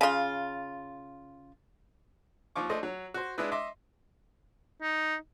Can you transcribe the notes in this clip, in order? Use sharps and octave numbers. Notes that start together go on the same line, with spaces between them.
C#3 F4
D#2 F3 F4 C#6 D6
A3 D4 C5 D#5
F#3
F#4 C5
G#3 D4 E4 B4
D#5 E5 C6 D6
D#4